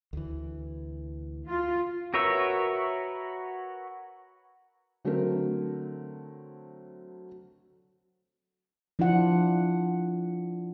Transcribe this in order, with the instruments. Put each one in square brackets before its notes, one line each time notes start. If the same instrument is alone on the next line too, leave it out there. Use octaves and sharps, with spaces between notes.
[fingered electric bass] D2 E3
[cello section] F4
[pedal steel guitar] F#4 A#4 B4 C#5 E5
[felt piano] D3 F#3 A3 C4 A#4
[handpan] F3 D4 E4 F4 F#5